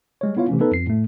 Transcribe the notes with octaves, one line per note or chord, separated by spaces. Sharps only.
G3 G#3 C#5
B3 E4 F4 C#5 F5
C3 E3 A3 C#4
B3 D#4 A4 B4
F2 C7
A2 A3